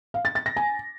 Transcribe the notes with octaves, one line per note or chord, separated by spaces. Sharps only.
F5
A6
A6
A#6
G#5